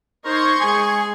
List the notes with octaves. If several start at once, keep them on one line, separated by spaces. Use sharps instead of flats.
D#4 A#4 C5 C6 C#6 G#6
G#3 G#4 G#5